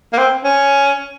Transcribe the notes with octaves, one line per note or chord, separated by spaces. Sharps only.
A#3
C4
C#4